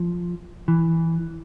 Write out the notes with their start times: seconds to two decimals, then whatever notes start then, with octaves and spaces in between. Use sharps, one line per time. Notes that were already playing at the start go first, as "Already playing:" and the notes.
Already playing: F3
0.68 E3